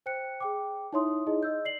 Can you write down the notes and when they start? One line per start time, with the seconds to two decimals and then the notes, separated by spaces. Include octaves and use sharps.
0.06 C5 G5 F#6 C#7
0.40 G#4 G5 D6
0.93 D#4 E4 C#5 E5 C6 D#6
1.27 D#4 E4 G#4 D#5
1.43 D#5 E6 G6
1.65 D5 C7 F#7